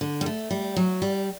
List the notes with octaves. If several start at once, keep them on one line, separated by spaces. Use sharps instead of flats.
D3
G3
A3
G3
F#3
G3